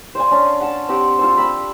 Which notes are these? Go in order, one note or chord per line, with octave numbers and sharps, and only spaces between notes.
C5 D5 F5 G#5
C#4 D4
F#5 A5
C4 G4 F#5
F4 A4 C5
B5 E6